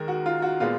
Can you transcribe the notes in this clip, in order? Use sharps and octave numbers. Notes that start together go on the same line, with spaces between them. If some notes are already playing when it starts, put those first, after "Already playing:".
Already playing: D#2 D#3 G#3 A#4
F#4
F4
F#4
A#2 G#3 B3 F4